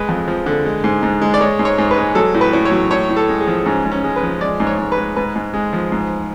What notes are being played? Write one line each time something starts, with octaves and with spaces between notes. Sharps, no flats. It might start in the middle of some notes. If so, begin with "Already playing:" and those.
Already playing: G#3 B4
F2
F3
D3
G#3
G#2
G#2
G#3
D5
G#3 C#5
G#2
C#5
G#2
B4
G#3
F#3 A4
A2
B4
A2
C#5
F#3
A2 C#5
A2
A4
G#3
G#4
F3
G#2 C#4
G#2
C#4
G#3
B4
F3
G#3 D5
G#2
C#5
G#2
B4
G#3
G#2 B4
G#2
G#3
F3
G#2